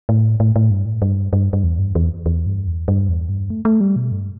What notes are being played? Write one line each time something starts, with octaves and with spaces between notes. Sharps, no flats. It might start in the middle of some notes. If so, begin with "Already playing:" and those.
A2
A2
A2
G2
A2
G2
G2
G2
E2
G2
E2
E2
G2
E2
G2
E2
G2
A3
A3
G3
B2
G2